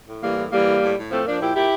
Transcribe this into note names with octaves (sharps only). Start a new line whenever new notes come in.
A2
E3 G3 A#3
A2
E3 G3 A#3
A2
A2
A2
F3 A3 C4
F3 A#3 D4
A#2 E4 G4
A#2 E4 G4